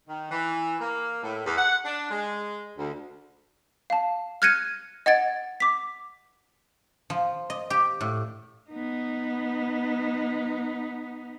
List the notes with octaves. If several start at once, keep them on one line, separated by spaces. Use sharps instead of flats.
D#3
E3
A#3
A2
E2
F#5
D4
G#3
D2
F5 A5
F6 F#6 G#6 A#6 C#7 D#7
D#5 F#5 G#6 A6 D7
D6 B6
F3
D#5
G4
A2
B3 D#4